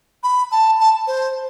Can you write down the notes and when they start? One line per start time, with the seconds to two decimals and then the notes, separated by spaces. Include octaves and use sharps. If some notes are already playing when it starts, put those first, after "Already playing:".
0.23 B5
0.52 A5
0.80 A5
1.07 C5